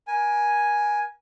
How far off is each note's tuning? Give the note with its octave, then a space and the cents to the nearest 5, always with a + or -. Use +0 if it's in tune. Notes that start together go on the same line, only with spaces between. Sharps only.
A#4 +35 G#5 +0